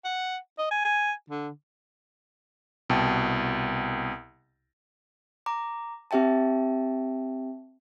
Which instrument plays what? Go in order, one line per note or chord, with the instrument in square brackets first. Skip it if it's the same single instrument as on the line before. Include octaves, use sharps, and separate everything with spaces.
[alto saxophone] F#5
D#5
G#5
G#5
D3
[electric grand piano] C2 B2 G5 A5
[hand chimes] A#5 D6
C4 G4 E5 G5 A5